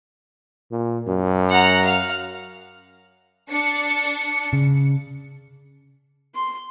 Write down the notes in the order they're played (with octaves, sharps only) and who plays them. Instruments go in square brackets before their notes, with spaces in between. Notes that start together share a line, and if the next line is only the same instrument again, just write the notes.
[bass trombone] A#2
F#2
[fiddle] F#5 A#5
F5
[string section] D4 C#7
[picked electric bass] C#3
[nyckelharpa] C6